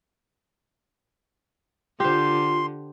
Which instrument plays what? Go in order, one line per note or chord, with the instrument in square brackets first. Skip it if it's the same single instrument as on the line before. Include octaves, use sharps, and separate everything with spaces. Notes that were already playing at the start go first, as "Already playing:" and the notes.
[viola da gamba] D3 [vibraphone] F4 [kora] G4 C5 [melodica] C6